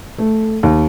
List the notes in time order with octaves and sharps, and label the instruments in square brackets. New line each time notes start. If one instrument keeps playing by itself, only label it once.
[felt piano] A3
D#2